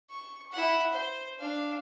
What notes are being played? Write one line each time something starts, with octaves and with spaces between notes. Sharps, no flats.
C#6
E4 F#5
C5
D4 F5